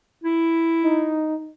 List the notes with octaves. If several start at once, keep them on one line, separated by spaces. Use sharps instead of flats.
E4
D#4